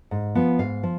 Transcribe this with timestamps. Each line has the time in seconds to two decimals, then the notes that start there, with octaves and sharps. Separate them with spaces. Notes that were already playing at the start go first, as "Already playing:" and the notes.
0.11 G#2
0.35 F3 B3
0.59 G#2 F5
0.83 F3